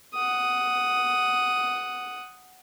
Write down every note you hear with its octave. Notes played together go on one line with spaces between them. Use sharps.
F#5 D#6